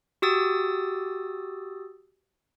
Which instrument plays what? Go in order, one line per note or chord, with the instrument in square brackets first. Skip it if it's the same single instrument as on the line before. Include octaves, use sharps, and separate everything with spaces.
[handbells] F#4 G4 D#6 E6 A6